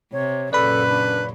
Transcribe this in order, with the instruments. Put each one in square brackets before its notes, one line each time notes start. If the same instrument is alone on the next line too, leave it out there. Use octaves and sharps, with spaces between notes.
[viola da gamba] C3 [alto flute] C#5
[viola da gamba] F#2 A#2 C#3 [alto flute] A4 [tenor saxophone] B4 [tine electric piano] D5 B5
[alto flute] D4